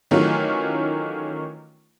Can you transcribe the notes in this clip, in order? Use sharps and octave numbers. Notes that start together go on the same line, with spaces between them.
D#3 E3 F#3 A3 C#4 F4